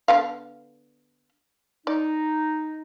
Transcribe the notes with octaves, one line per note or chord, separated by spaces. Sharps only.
D3 B3 F5
D#4 D5